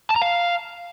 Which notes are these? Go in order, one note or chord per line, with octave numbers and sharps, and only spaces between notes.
A5
A#5
F5